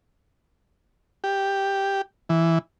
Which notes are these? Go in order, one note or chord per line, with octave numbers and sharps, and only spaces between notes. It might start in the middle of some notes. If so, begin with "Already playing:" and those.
G4
E3